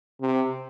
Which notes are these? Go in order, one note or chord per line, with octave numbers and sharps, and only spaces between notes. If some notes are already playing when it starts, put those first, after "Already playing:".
C3